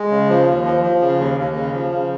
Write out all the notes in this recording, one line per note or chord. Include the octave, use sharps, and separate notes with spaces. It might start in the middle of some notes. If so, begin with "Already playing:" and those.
Already playing: G#3
C#3
F3
D#2
F3
F3
C#3
D#2
D#2
C#3
F3
C#3